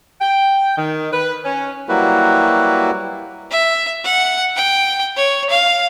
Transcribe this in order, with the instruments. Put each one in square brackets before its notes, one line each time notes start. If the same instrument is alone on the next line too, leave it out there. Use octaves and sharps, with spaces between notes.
[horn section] G5
D#3
B4
C#4
[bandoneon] F#3 G3 A#3 E4 F#4 B4
[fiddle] E5
F#5
G5
C#5
F5